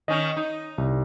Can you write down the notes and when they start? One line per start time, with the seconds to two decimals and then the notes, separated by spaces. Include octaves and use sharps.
0.08 D#3 C#4 D#4 D#5
0.36 D#4
0.78 C2